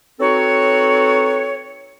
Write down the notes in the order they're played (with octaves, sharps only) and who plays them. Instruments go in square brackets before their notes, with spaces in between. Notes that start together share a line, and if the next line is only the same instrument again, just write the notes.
[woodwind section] C4 D#4 F#4 A4 B4 C#5